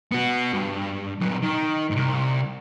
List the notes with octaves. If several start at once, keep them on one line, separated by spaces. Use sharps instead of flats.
B3 F#4
G2
A#2 F#3
D#3
C2 G#2